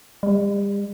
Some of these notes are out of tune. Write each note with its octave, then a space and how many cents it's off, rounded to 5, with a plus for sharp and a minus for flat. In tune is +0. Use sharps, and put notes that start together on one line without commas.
G3 +40